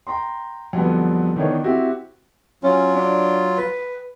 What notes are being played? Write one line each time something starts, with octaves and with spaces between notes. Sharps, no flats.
G5 A#5 C6
F2 D3 F#3 G3 B3
D#3 E3 B3 D4 A#4 C#5
C4 E4 F#4 G4
F#3 C#4 F4
D4
B4